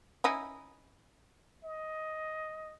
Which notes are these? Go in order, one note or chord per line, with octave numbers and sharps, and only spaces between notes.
C#4 D#4 E4
D#5